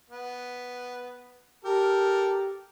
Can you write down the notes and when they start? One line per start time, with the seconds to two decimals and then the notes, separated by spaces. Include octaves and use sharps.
0.10 B3
1.64 G4 A4 A#4